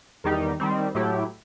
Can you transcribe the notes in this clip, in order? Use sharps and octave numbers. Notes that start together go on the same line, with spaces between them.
E2 D#3 G3 D#4 G4
D#3 G3 C4
A2 F#3 A3 E4 G4